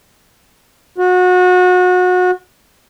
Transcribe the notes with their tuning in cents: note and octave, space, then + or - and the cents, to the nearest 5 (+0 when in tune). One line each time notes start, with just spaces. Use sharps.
F#4 -30